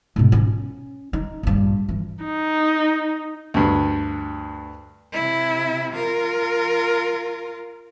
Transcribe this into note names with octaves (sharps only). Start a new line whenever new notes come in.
G#2 B2
C#4
D#4
A#1 G2
E3
D#4
D2 G2
C3 E4
F4 A#4